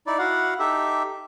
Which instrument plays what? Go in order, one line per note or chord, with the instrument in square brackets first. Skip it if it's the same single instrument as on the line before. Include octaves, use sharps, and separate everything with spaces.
[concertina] D#4 E4 D5
E4 F#4 F5 F#5
D#4 G4 A4 E5